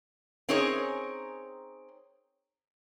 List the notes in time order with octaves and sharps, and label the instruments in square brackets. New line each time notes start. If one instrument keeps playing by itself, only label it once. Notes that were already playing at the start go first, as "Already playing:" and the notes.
[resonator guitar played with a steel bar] C4 C#4 D#4 G#4 A#4 C#5